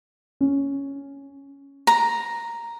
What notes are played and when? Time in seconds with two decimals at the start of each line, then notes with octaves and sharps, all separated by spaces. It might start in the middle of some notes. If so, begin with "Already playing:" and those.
0.41 C#4
1.87 A#5